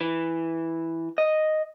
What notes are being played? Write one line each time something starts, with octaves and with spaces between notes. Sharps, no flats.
E3
D#5